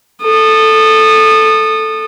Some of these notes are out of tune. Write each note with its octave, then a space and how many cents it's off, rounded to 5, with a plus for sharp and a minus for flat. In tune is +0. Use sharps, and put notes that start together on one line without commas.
A4 +0 D#6 -25